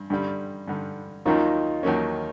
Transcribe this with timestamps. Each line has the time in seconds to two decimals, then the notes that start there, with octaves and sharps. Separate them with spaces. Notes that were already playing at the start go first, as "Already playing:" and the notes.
Already playing: G2
0.10 G2 D3 G3
0.68 G2 D3 G3
1.25 D#2 D#3 F#3 A#3 C#4 D#4 F4
1.83 D#2 D#3 F#3 A#3 C#4